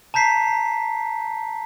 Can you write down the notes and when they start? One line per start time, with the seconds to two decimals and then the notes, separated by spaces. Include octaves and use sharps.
0.14 A5 A#5 G6 B6 C7